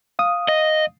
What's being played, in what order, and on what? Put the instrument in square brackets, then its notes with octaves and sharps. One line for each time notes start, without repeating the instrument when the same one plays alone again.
[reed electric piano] F5 D#6
[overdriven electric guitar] D#5